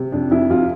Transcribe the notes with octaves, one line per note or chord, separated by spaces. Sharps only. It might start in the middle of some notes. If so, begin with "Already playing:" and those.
Already playing: C3
F2 D4
F2 E4
F2 F4